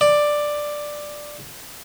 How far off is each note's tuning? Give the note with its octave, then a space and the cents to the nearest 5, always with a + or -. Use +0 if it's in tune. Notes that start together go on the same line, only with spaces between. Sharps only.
D5 +5